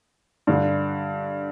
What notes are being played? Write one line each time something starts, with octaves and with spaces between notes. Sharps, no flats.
G2 D3